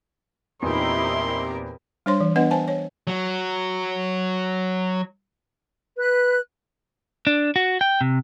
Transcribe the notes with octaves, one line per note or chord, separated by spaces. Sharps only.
E2 A#2 C4 D#4 E4 G4 A#4 C6
G3 D4 C5 C#5 C6
E3
B3 D4 B4 D#5 F#5
C5 G#5 A5
C#5
F#3 F#4
B4 F#6
D4
F#4
G5
C3